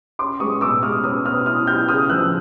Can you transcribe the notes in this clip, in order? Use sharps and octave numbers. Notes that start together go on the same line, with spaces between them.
C#4 C6 D6
G#3 C#6 D#6
B2 D6 E6
G#3 D#6 F6
C#4 D#6 F6
B2 D#6 F6
E4 D#6 F6
E4 F6 G6
C#3 D#6 F6
F3 E6 F#6